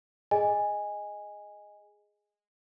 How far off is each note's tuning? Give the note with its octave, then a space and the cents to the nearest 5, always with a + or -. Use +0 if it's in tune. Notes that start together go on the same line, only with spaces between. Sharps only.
G#4 +0 D#5 +0 G#5 -10